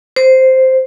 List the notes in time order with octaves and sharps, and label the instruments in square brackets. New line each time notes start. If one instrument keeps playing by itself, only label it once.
[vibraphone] C5